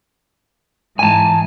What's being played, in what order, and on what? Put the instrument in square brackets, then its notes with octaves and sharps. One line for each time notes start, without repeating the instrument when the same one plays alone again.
[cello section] G#2 E3 [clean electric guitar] G#5 A5